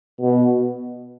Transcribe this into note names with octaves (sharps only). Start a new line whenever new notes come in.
B2